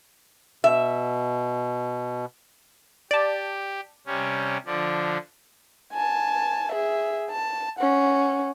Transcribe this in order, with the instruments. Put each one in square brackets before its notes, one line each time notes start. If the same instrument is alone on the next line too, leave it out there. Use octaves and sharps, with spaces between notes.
[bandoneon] B2 [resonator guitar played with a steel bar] E5
[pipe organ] G4 [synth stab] D5 A5
[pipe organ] C3 G3 C#4
D3 F3 D4
[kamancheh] G#5 A5
G#4 E5
A5
C#4 F#5